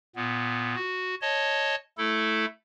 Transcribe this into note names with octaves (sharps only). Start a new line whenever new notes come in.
A#2 B3
F#4
C#5 D#5 A5
A3 E4 A4